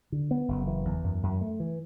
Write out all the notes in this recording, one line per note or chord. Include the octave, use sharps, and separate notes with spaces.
D3
B3
F#1
E3
E2
F#2
F#2
A3
E3